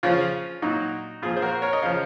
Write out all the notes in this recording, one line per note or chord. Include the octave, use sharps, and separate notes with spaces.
C#3 F3 C#4 F4
A#2 F#3 D#4 F#4
A#2 F3 F4 G#4
C5
F#4 A#4
A#4 C#5
D#5
C#3 F3 C#5 F5